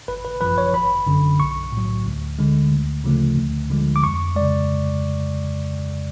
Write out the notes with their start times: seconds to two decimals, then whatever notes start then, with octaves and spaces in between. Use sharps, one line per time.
0.08 G#1 B4
0.25 B4
0.41 F#2 F3 B4
0.58 C#5
0.74 G#1 B5
1.06 F#2 D3
1.39 B1 C#6
1.72 A2 F#3
2.06 D2
2.39 D3 G#3
2.72 D2
3.04 C#3 F3 A3
3.38 D2
3.70 D3 F3 G#3
3.96 D6
4.03 F2 C#6
4.36 C#3 G#3 D5